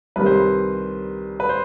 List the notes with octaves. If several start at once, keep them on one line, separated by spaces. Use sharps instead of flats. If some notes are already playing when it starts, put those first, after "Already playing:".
C2 C3 D#3 G3 B4
C5
B4
B4
C5